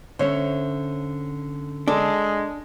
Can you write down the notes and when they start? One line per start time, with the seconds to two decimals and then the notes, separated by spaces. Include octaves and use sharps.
0.19 D3 C#4 C5 C#5 E5
1.88 G#3 D4 A4